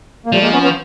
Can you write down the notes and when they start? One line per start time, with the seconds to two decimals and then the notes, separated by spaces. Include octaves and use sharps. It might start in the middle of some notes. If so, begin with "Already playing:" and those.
0.26 A#3
0.32 F3 G3 A3
0.42 G#3 A#3
0.52 B3 C#4
0.62 B3 C#4